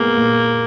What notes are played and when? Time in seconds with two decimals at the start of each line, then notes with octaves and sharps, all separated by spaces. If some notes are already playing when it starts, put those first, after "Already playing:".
Already playing: A#2 G#3 A#3 B3
0.17 A#2